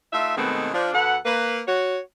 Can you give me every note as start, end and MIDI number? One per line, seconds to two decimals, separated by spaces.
0.13 0.35 57
0.13 0.35 63
0.13 0.35 65
0.13 0.35 76
0.36 0.69 47
0.36 0.69 51
0.36 0.69 56
0.36 0.69 57
0.36 0.69 59
0.36 0.69 60
0.73 0.93 53
0.73 0.93 62
0.93 1.16 38
0.93 1.16 69
0.93 1.16 71
0.93 1.16 78
1.25 1.61 58
1.25 1.61 71
1.67 1.99 66
1.67 1.99 73